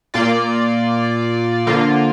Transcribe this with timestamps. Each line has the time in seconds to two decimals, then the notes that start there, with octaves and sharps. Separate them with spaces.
0.14 A#2 A#3 F4 D5
1.66 D3 F3 A#3 F4